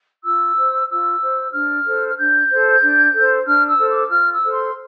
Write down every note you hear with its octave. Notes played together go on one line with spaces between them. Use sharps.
F4 E6
C5
F4 E6
C5
D4 F6
A4 C5
F6
D4 G6
A4 C5
D4
A4
C5
D4 F6
E6
A4 C5
D6
F4 F6
E6
A4 C5
C6